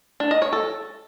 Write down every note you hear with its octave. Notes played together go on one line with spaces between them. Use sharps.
D4
D#5
C#5
A4